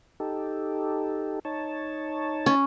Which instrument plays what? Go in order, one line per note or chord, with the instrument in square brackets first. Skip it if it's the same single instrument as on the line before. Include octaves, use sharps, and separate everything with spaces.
[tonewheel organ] D#4 G4 A4
D#4 C#5 A5
[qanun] C#4